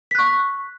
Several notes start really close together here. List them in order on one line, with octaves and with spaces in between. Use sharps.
B6 F#6 C#6